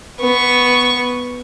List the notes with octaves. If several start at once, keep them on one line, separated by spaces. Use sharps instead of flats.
B3 C#6